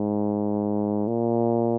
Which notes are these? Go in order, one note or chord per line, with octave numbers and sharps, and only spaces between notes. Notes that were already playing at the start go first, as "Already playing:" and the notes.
Already playing: G#2
A#2